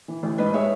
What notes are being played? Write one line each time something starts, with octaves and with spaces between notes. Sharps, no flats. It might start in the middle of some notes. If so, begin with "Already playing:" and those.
E3
A1
G#2 B4 D#5
G#3 C#5 E5